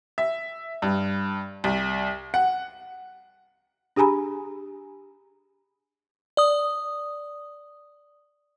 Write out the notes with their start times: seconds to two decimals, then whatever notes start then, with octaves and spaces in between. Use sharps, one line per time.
0.18 E5
0.82 G2
1.64 C2
2.34 F#5
3.96 D4 G4 G#4 G#5 A#5 B5
6.37 D5 D#6